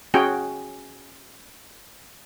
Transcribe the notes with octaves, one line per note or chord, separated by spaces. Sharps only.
C#4 F#4 G#4 G5